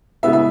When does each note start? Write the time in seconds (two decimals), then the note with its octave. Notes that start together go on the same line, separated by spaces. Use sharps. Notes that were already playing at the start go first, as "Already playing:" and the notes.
0.23 C#3 E3 G#3 B3 E5
0.33 E5